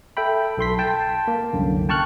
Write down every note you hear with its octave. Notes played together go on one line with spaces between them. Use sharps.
A4 E5 G5 B5
B1 A4 C6 B6
G5 A5
A#3
C2 F#2 D3
G5 A5 C#6 F6 F#6